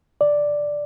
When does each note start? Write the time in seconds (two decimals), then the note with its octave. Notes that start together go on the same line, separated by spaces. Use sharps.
0.21 D5